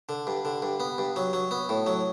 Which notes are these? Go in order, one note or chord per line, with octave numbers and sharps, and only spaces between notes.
D3
G2
D3
G2
B3
G2
F#3
F#3
B3
A2
F#3